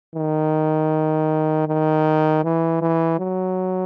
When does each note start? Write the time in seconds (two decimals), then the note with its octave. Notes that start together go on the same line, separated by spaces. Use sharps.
0.16 D#3
1.68 D#3
2.44 E3
2.82 E3
3.19 F#3